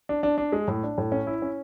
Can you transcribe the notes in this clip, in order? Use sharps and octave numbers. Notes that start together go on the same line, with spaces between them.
D4
D4
D4
G#3
A2
D4
A2
C#4
E4
C#4